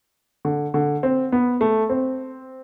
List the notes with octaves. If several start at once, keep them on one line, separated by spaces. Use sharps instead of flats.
D3
D3
C4
B3
A3
C4